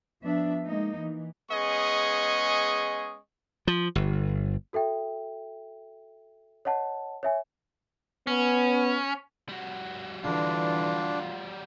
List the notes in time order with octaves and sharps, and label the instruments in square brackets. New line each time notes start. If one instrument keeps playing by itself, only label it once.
[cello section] F3 B3 D4 E5
G#3 A#3 D#4
E3
[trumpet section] G#3 B3 C#4 G#4 D#5 C#6
[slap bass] F3
G1
[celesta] F#4 A4 E5 G5
C#5 D#5 F#5 A5
C#5 E5 G#5
[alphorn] B3 [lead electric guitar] C#4
[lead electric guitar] G3 F#4
[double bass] D3 E3 [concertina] D4 [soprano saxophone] F4